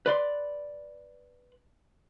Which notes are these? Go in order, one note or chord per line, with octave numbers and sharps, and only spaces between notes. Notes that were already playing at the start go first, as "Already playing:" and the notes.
B4 D5 C6